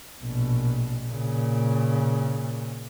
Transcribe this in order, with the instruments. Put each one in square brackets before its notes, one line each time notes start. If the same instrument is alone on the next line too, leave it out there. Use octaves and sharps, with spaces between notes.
[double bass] A#1 B2
A#2 C#3